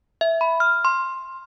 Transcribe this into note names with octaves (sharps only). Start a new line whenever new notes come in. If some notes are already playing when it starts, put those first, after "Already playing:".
E5
B5
F6
C6